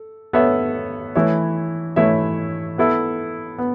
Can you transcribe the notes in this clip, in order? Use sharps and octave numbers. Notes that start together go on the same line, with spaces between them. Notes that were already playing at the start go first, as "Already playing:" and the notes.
Already playing: A4
B3 A4 C#5 E5
E3 A3 E4 C#5 E5
E3 A3 E4 C#5 E5
B3 E4 A4 E5
B3